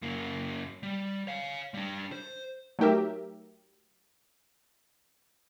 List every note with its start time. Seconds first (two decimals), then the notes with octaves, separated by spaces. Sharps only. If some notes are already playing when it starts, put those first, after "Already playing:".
0.02 F#2 A#3
0.83 G3
1.27 C#5 F5
1.74 G3 D4
2.12 C5
2.79 F#3 A3 D#4 G4 A#4 E5